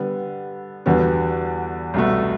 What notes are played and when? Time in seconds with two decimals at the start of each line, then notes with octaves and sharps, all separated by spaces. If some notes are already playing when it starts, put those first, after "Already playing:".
Already playing: D3 G3 B3
0.86 E2 D3 G3 B3 F#4
1.94 C2 B2 A3